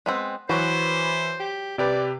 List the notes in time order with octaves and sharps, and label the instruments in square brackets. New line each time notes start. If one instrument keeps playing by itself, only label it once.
[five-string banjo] G#3 B3 C4
[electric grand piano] E3 [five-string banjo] F#3 F#4 [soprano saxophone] B4 [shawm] C5
[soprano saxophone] G4
[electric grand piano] C3 G4 B4 [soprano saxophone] D5